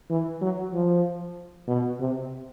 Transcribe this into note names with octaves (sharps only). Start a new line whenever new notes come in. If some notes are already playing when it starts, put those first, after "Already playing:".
E3
F#3
F3
B2
C3